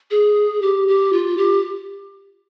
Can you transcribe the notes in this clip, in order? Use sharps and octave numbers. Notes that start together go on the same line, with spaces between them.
G#4
G4
G4
F4
G4